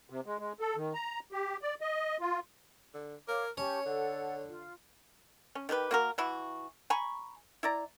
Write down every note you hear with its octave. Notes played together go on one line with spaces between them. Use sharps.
C3
G#3
G#3
A4
D#3
A#5
G4
D5
D#5
F4
D3
A#4 C#5 F5 D6
C#4 G4 C#5 A5 C#6
D3 A4 F#5
F4
C#4
D#3 G4 G#4 B4
A#3 F#4 A#4
E3 E4 F#4
G#5 A#5 B5 C#6
E4 D5 A#5